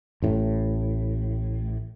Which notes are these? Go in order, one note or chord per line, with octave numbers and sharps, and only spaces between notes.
A1 A2